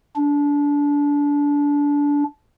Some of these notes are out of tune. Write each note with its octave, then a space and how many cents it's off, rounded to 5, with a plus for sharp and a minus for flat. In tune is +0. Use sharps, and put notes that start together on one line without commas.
D4 -25